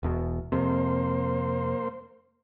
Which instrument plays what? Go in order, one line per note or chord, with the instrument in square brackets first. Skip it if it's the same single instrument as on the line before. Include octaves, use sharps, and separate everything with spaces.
[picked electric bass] E1 E2 B2
[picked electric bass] F2 C3 [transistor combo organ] A#3 C5